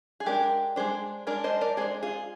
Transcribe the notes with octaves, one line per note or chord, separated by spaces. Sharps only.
G#4
G#3 D4 G4 A#4
G#3 D4 G#4 C5
G#3 D4 A#4 D5
C5 D#5
A#4 D5
G#3 D4 G#4 C5
F4 G#4